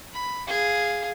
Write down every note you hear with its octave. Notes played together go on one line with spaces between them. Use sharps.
B5
G#4 F5